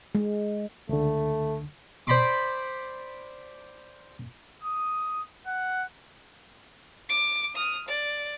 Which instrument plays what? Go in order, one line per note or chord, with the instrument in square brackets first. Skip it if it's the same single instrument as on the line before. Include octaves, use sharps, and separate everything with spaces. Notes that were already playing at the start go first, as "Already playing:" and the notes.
[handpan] G#3
[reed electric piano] C#2 D3 [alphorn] A3
[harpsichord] C5 D5 B5 C6 D6
[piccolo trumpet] D#6
F#5
[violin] D6
D#6 F6
D5